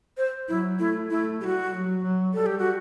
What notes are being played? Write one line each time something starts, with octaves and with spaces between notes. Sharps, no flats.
C5
F#3 E4
A3 E4
A3 E4
G3 F#4 G4
F#3
F#3
G3 A4
G4
F#4